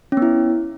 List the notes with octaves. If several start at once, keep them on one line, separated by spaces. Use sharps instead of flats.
B3 C#4 E4